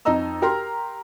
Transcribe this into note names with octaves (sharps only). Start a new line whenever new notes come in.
F2 D#4 D#5 A#5 E6
G4 A#4 A#5 C6